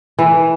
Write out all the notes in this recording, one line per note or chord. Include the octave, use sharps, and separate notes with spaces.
E3